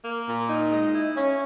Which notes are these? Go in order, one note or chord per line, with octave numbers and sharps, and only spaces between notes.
A#3
A#2
D#4
G#3
E4
C#4